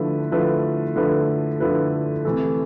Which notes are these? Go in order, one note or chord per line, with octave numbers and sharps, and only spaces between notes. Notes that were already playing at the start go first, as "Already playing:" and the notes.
Already playing: D3 F3 A3 E4 B4
D3 F3 A3 E4 B4
D3 F3 A3 E4 B4
D3 F3 A3 E4 B4
C3 E3 A3